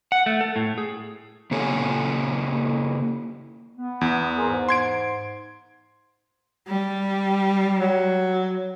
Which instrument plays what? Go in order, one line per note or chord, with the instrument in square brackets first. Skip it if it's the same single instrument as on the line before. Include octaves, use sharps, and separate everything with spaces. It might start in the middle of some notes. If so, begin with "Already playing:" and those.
[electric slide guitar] F#5
A3
A4
A2
G#4
C#3 A#3 G4 A4 C#5 G#5
[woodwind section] B3
[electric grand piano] E2
[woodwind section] C4 G#4 A#4
G#2
[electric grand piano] C6 G#6 D7
[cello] G3
[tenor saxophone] F#3